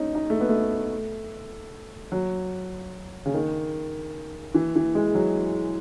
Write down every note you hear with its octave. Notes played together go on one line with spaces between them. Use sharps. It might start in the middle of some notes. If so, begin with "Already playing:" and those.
Already playing: C#4 D#4
D#4
A3
B3
A3
F#3
C#3
D#3
E3
E3
G#3
F#3